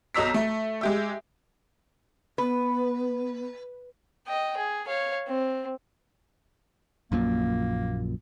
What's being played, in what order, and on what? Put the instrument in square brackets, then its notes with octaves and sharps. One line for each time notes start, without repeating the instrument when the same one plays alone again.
[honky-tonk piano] B1 F#3 D#5 A#5 E6 B6
A3
G#3 G4 E5
[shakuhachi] B3 [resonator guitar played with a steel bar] B4
[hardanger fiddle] D#5 G5
G#4
C#5 F5
C4
[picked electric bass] A#1 F#2 A#2 [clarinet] A#3